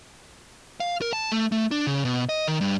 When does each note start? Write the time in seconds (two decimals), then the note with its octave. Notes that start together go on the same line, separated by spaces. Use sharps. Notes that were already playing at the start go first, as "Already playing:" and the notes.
0.80 F5
1.02 A#4
1.13 A5
1.32 A3
1.52 A3
1.71 D4
1.87 C#3
2.05 B2
2.29 D#5
2.48 D#3
2.61 G2